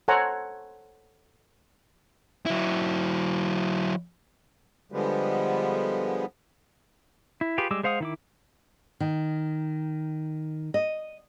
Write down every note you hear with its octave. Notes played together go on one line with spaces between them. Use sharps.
A4 C5 C#5 F#5 G#5 A#5
F#3 E4
D3 F3 G3 G#3 B3
E4
F4 G4 G#4 B4
G3 G#3 D6 E6
G#3 C5 F5 F#5 D#6
D#3 E4 D6
D#3
D#5